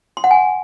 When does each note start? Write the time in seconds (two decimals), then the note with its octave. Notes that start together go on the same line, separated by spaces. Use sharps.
0.17 C6
0.24 F#5
0.31 G#5